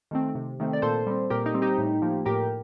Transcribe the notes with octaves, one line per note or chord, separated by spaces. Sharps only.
D#3 A3 C4
C3
D#3 A3 C4
D5
A#2 A4 C5
G3 C4
A#2 G4 A#4
D#4 G4
G3 C4
D#4 G4
A2
F3 A#3
A2 G4 A#4